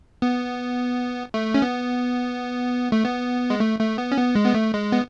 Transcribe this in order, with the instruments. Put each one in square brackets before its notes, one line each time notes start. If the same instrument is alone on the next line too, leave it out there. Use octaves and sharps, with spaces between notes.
[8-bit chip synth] B3
A3
C#4
B3
A3
B3
G#3
A3
A3
B3
C#4
B3
G#3
B3
A3
G#3
B3